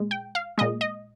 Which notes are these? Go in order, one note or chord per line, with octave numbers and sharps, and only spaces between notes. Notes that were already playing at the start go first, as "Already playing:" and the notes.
Already playing: A#2 G#3
G5
F5
A#2 G#3 D#5
D#5